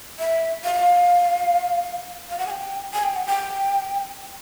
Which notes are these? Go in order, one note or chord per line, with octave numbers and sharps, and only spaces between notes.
E5
F5
F5
F#5
G#5
G5
G#5
G5
F#5
G5